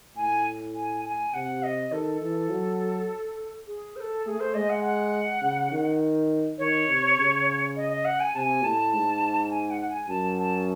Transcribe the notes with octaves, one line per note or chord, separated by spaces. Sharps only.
A2 G#5
G#5
G#5
C3 F#5
D#5
D#3 A4
E3 A4
F#3
G#4
C5
A4
A3 G#4
C5
G#3 D#5
F#5
F#5
C#3
D#3
D#3 C#5
C3
C#3
D#5
D#5
F#5
G#5
C3 G#5 A5
A2 A5
G#2
G#5
F#5
F#5
G#5
F#2 A5
A5